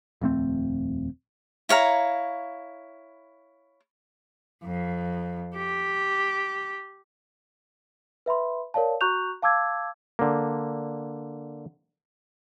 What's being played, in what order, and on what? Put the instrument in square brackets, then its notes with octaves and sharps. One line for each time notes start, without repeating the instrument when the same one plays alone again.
[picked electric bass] D#1 F2 A3 C4
[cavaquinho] E4 C#5 F5 A#5
[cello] F2
G4
[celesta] B4 E5 B5 C6
A#4 C#5 D5 F5 A5
F#4 A#5 C#6 F#6 G6 F7
F5 A5 D6 E6 G#6
[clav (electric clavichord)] D3 A#3